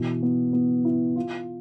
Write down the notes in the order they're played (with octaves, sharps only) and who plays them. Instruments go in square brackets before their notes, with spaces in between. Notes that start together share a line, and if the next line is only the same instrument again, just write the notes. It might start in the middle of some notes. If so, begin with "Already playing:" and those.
Already playing: [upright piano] B2 E3
B3
B3
E4
F4